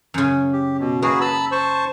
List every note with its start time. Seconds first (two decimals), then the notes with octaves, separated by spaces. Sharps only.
0.14 F#2 C#3
0.53 G4
0.79 B2
1.02 A#3 F#4 G#4 B4
1.21 A5 B5 E6
1.52 C5 A5 C#6